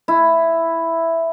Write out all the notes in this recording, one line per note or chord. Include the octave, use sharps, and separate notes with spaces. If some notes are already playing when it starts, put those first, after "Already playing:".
E4